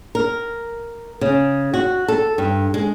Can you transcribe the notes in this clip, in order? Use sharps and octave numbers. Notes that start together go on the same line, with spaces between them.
A#4
C#3
F#4
A4
G2
G#3